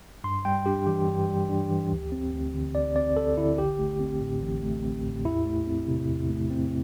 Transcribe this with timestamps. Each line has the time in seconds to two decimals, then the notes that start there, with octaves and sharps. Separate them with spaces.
0.24 G2 C6
0.45 G3 G5
0.66 D4 G4
0.87 E3 G4
1.07 G2
1.28 G3
1.49 D4
1.70 E3
1.91 D2
2.12 C4
2.33 D2
2.54 D3
2.75 D2 D5
2.96 C4 D5
3.17 D2 A4
3.37 D3 E4
3.58 A1 G4
3.79 A3
4.00 C4
4.21 A2
4.42 A1
4.63 A3
4.83 C4
5.04 A2
5.25 E2 E4
5.46 A3
5.67 C4
5.88 C3
6.09 E2
6.30 A3
6.51 C4